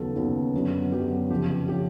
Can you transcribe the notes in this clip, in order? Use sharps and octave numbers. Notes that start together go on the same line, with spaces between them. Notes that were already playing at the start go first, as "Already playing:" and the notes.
Already playing: D#2 C#3 F#3 B3 A4
D#2 C#3 F#3 B3
F#2 D3 F#3 B3
F#2 D3 F#3 B3 G4
F2 C#3 F3 G4
C#3 F3 G4